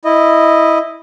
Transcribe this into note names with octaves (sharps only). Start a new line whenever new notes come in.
E4 D#5